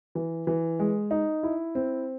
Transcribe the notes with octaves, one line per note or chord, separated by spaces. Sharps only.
E3
E3
G#3
D#4
E4
C4